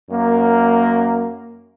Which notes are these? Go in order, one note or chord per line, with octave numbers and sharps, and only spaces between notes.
F#2 A#3